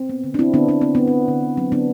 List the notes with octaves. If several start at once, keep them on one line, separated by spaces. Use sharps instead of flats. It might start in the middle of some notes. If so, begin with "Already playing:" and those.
Already playing: C4
B3
D3
D4
D3 C4 E4
D3 B3 D4
B3 D4
B3 C4
D3 B3
C4
D3
D3
D3
F#3 C4
D3 B3 D4